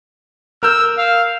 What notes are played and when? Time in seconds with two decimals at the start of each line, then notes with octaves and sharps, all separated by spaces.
0.63 A#4 E6 F6 G6
0.98 F5